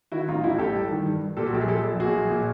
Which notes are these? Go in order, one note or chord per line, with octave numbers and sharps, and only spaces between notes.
D#3 E4 F#4
A1 D#4 F4
A1 E4 F#4
A1 G4 A4
G2
D#3
G2
G2
A#2 G4 A4
F#4
A#1 G4
G#4
A#1 G4 A4
A#1
A#2 F#4 G#4
A#1
A#2